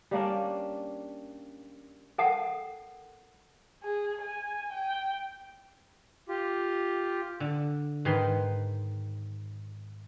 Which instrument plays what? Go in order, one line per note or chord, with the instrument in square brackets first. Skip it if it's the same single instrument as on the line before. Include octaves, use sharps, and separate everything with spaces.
[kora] G3 A#3 C#4 D4
[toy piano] A4 A#4 F#5 G5 A5 D#6
[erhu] G#4
G#5
G5
[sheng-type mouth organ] F4 G4
[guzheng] D3
G#2 D#3 B4 C6